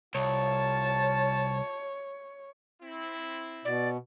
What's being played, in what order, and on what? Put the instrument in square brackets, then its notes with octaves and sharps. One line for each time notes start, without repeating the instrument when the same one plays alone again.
[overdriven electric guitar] C2 [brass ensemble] F4 A5 [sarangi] C#5
[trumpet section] C4 E4
[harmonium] B2 [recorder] D5